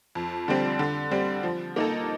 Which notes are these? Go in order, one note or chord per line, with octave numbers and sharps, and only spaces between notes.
F2
D3 G3 C4
D3
G3 C4
F3
A#3 D#4 A4